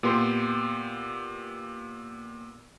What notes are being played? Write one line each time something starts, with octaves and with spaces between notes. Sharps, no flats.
A#2 B3 G4 C6